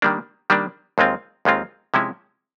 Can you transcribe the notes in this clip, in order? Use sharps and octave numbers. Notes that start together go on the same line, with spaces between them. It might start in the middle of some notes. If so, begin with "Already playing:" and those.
D#3 G3 A#3 D4
D#3 G3 A#3 D4
D#2 D#3 G#3 C4 F4
D#2 D#3 G#3 C4 F4
C3 F3 G#3 C#4 E4